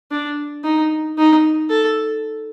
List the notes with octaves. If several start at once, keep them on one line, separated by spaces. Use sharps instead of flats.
D4
D#4
D#4
A4